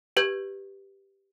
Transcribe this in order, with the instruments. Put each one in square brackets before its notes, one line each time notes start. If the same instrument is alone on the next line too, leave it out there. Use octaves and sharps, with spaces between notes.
[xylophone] G4 B4 G6 G#6